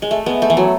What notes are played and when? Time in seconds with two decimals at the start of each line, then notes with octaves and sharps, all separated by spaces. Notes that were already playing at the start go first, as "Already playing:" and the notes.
0.02 G#3
0.11 A3
0.26 G#3 B3
0.42 A3
0.50 E3
0.57 F#3